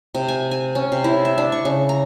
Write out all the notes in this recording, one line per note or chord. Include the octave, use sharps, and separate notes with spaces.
C3
G#5
G#5
C#4
C3
E4
E5
D4
C#6
C#3
A#5